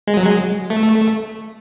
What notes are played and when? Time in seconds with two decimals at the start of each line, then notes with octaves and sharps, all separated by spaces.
0.08 G#3
0.17 F#3
0.25 G#3
0.70 A3